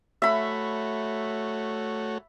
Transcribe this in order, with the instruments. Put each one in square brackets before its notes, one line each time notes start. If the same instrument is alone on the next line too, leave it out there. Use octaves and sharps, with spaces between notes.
[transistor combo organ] A3 F#4 C#5 [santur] E5 B5